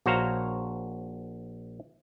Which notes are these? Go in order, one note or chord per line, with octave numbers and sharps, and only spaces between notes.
A#1 F#4 C5 C#5 F5 A#5